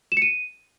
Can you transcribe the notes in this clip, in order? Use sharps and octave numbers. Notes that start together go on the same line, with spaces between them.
E7
C#7
D#7